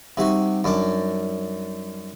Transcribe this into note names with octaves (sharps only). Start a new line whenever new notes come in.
C3 G3 D#4 F#4
F#2 D4